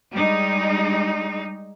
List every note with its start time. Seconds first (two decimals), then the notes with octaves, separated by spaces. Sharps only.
0.13 G3 G#3 D#4